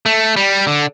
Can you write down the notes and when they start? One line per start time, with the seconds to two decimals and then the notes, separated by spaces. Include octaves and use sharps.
0.06 A3
0.37 G3
0.67 D3